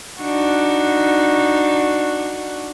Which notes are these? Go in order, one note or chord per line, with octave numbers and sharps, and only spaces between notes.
D4 D#4 F#4